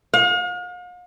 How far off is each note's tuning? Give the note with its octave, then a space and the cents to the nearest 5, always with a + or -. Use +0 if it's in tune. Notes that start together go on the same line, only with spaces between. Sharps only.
F5 +45